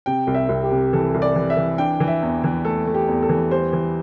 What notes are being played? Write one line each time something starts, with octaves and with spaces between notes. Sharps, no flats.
C3 G5
C2
E5
C2
G4
C3
E3 A4
C2
D5
E3
E5
E3
D4 G5
E3
E5
E2
E3
A3 A4
A3
G4
E2
A4
E3
G3 C5
E3